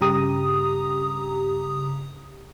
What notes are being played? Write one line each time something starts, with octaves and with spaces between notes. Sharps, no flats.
G2 C#3 G4 A#5 D#6